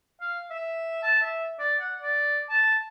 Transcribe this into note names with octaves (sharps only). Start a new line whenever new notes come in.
F5
E5
A5
E5
D5
F#5
D5
A5